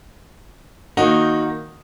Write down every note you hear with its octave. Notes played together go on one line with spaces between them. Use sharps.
D#3 A#3 D#4 F#4